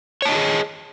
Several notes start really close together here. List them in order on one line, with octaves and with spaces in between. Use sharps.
C#5 A5 D#5 G4 G#4